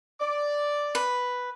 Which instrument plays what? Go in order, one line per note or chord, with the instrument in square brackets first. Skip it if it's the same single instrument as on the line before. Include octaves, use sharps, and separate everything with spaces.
[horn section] D5
[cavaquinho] B4